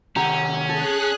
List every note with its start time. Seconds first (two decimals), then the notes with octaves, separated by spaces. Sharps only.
0.16 C3 D#3 C#4 G4 F#5 A#5
0.69 G#4 A4 F#6